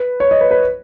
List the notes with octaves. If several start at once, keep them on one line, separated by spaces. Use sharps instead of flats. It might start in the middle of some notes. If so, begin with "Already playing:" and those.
Already playing: B4
C#5
D#5
B4
B4